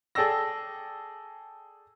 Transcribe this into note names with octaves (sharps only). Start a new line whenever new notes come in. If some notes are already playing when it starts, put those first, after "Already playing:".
G#4 A4 D5 G5 E6 A#6